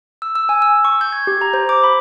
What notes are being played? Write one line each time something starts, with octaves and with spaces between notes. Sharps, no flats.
E6
E6
G#5
E6
C#6
G6
G#6
G4
A#5
C5
D6
B5